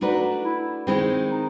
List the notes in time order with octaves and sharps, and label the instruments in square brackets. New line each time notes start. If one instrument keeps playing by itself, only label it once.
[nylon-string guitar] A3 D4 F#4 B4 D5 [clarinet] D#4
[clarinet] E4
[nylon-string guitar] D#3 G#3 C4 [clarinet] E4
[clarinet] D#4